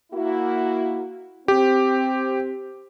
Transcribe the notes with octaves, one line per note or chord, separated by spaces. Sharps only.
A#3 E4 F#4
C4 G4